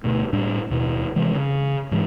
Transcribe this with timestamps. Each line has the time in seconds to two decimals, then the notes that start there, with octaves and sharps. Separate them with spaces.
0.04 D2 B2 A3
0.33 A2 G3 D4
0.70 D#2 B2
1.16 C3 E3 G#3
1.35 C#3
1.91 G#2 E3 G#3